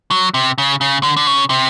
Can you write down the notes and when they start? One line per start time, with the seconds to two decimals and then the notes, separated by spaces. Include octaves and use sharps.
0.11 F#3
0.34 C3
0.58 C#3
0.81 C#3
1.03 D3
1.17 D3
1.27 C#3
1.50 C3